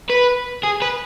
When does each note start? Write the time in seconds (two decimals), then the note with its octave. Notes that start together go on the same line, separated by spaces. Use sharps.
0.09 B4
0.63 G#4
0.82 B4